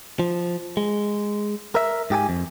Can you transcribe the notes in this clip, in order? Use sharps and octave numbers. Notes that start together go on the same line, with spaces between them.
F3
G#3
A#4 E5
G#2 G4 G#4 G#5
F2